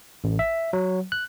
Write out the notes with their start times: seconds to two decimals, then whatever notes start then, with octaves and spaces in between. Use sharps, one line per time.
0.24 A1
0.39 E5
0.73 F#3
1.12 F#6